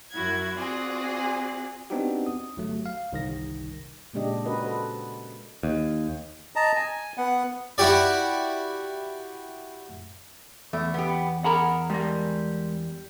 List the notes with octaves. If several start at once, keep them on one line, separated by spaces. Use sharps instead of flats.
F#2 E4 F#4 G#6
C4 F4 F#4 G#4 D5
B3 C4 D4 D#4 F#4 G4
D#6
G1 F#3 A3
F5
G1 C2 D#3 A#6
A#2 C#3 G#3 D4 G4 D#5
C#4 F#4 A#4 B4 D#5
A4 B4 C5
D#2
D#5 A5 A#5
G#5
B3 F#5
E4 F#4 G4 D5
E2 A3
B3 G4
G#4 A#4 F#5 A#5 B5
G3 G#3 A#4